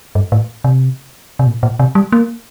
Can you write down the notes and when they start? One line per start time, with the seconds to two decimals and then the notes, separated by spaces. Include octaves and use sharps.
0.15 G2
0.32 A2
0.64 C3
1.39 C3
1.47 A#2
1.63 A#2
1.79 C3
1.95 G3
2.12 A#3